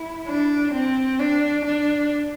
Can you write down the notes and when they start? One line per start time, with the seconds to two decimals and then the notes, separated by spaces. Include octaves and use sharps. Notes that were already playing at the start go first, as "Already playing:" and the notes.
Already playing: E4
0.28 D4
0.73 C4
1.20 D4
1.65 D4